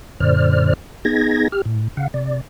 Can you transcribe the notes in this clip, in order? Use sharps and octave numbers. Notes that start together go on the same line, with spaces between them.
F#2 A#2 D3 C5 D5 F6
B3 D#4 G#4 G#6 A#6
G4 F6
A2
C#3 F5 F#5
C3 D5